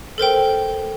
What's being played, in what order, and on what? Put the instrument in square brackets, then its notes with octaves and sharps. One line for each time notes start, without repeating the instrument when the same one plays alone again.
[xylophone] A4 A#4 C5 G5